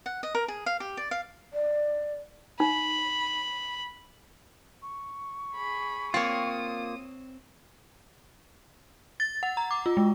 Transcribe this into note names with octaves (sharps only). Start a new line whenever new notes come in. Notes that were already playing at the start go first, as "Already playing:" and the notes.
F#5
D#5
A#4
G#4
F5
G4
D5
F5
D5
D#4 B5
C#6
G#4 B5
A#3 C4 F4 C#5 D#6
A6
F#5
A#5
D6
F4
G#3